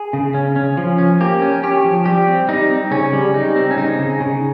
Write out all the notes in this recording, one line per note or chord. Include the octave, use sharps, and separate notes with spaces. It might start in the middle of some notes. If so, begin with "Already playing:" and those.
Already playing: G#4
C#3
C#4
C#4
F3
C#4
A#3 G4
C#4
C#4 G4
F3
G3 G4
C4
G3 D#4
C4
C#3 C#4
G3
G3 D#4
C4
C#4
C#3 D#4
C#3
C#3